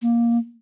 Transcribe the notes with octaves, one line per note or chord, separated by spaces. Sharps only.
A#3